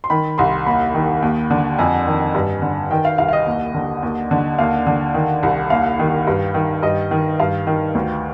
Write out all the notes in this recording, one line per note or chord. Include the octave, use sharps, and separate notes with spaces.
C6
D#3 B5
C2 C6
D#2 B5
D#3
D#2
D3
F2 G#5
D#3
G2
D3
D#3 G5
F5
C2 F5
F5
D#5
D#2
D3
D#2
D3
D#2 F5
D3
D#3
C2
D#2 F5
D#3
G2
D#3
G2 D#5
D#3
G2 F5
D#3
D2